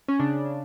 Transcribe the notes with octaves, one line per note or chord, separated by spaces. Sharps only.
C#4
C#3 D4